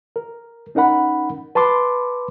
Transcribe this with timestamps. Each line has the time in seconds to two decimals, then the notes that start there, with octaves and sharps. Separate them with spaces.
0.16 A#4
0.75 C#4 D#4 A#4 F#5 B5
1.55 B4 A5 B5 C6 D6